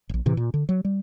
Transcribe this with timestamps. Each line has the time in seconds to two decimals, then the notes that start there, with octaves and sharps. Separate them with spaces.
0.09 D#1 A#1
0.26 A2 C3 E3
0.37 A#2
0.54 D3
0.69 F#3
0.85 G3